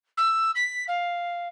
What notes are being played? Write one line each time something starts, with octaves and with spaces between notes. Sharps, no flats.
E6
B6
F5